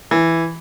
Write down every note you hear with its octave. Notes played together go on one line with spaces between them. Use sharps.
E3